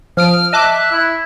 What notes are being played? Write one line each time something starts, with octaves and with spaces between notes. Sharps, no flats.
F3 D#6 F6 D7
D#5 E5 A5 D6 F#6
E4